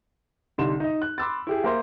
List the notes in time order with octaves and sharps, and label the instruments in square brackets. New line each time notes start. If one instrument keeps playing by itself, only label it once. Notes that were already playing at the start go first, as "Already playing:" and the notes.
[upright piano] C2 D3 G3 D#4 C6 E7
D#4 D#5
F#6
B5 C6 D6 E6 F#6 A6
E4 G4 G#4
A#3 A#4 C5 E5